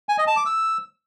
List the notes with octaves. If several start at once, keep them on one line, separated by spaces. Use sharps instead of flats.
G#5
D#5
A5
D6
E6